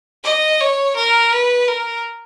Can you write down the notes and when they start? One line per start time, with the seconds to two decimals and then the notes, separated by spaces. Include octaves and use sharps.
0.24 D#5
0.60 C#5
0.96 A#4
1.32 B4
1.68 A#4